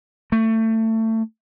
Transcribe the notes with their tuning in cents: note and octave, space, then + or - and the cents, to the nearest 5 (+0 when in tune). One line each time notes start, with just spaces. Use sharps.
A3 +25